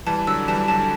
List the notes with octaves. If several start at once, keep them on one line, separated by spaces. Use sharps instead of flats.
E3 G3 A5
D3 F#3 E6
E3 G3 A5
D3 F#3 A5